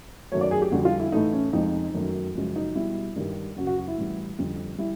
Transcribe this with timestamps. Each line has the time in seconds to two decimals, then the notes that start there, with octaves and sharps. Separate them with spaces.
0.32 F#2 D#3 F#3 A3 C#5
0.41 D5
0.51 G#4
0.62 G4
0.72 F2 D3 G3 F#4
0.85 F4
1.00 E4
1.12 A2 E3 A3 D#4
1.33 C#4
1.53 F2 C3 F3 G#3 D#4
1.94 F#2 D#3 F#3 A3
2.35 F#2 C#3 F3 G#3
2.56 D#4
2.75 B2 G3 E4
3.16 G2 D#3 G3
3.56 F#2 C#3 F#3 F#4
3.67 F#4
3.78 F#4
3.88 E4
3.97 A2 E3 G3
4.39 F2 D3 G3
4.78 G3 E4